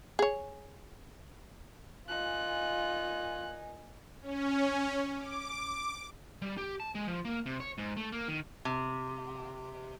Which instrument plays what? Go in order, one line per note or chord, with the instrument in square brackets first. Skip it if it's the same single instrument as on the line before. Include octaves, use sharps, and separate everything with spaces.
[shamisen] G#4 C#5
[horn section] A#2 G#5 [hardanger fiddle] D#4 [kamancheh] F4 [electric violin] F#6
[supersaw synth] C#4
D6
[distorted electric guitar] G3
G4
A5
G#3
F3
A#3
C3
C#5
G#2
A3
A#3
D#3
[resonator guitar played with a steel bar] C3